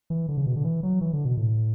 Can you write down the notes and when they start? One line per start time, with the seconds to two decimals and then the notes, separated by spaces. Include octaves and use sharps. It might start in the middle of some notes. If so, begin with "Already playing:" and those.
0.10 E3
0.29 D3
0.38 C#3
0.46 B2
0.56 D3
0.64 E3
0.83 F#3
1.01 E3
1.13 D3
1.25 B2
1.37 A2